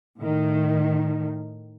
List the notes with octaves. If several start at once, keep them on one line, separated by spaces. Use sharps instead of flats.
A2 D#3